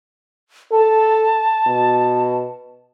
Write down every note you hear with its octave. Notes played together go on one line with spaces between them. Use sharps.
A4 A5
B2